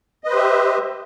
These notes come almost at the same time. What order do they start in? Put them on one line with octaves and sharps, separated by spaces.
D#5 B4 C5 G4 E5